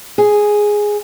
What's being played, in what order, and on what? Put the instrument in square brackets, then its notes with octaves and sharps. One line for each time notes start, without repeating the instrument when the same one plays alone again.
[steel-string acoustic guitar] G#4